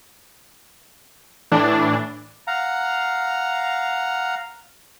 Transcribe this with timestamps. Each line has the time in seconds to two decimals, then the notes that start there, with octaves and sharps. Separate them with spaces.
1.52 A2 E3 D4
2.47 F5 F#5 A#5